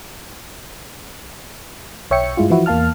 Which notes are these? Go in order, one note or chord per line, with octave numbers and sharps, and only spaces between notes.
B1 C#5 E5 G5 C#7
G2 G#3 E4 F4
E3 F3 E4 F#4
E2 A#3 F5 A5 F6